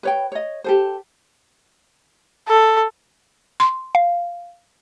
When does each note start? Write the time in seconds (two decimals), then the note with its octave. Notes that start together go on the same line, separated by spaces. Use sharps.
0.03 B4 C#5 G5
0.32 C#5 D#5
0.64 G4 A4 C5
2.48 A4
3.60 C6
3.95 F5